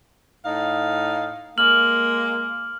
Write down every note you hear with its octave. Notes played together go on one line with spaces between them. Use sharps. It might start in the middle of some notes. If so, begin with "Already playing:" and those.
A2 D#4 F5
G#3 A#3 F6 F#7